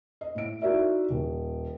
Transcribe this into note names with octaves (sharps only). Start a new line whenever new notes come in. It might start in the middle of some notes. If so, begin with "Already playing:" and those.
D#5
A2 D7
D#4 E4 F#4 A#4 D5 E5
D#1